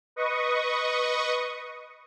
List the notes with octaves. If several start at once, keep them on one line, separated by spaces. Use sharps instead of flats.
B4 D#5 C#6 D#6